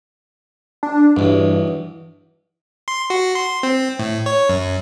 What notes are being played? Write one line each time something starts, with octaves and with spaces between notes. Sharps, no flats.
D4
B1 E2 G2
C6
F#4
C6
C4
A2
C#5
F#2